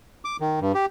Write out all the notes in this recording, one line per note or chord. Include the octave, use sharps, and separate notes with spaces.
D6
D#3
G2
G4